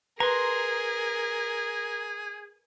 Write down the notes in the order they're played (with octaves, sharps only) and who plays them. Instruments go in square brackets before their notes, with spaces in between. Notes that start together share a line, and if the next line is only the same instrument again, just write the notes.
[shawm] G#4 [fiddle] A#4 [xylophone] B4 [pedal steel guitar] A#5 C6